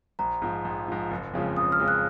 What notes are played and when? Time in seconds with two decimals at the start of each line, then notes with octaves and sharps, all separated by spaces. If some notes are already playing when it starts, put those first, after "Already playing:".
0.19 A#1 A#5
0.42 G#2 F3
0.65 A#1
0.88 G#2 F3
1.11 F#1
1.34 F2 C#3 F3 G#3
1.57 F#1 D#6
1.72 F6
1.79 F2 C#3 F3 G#3
1.88 F#6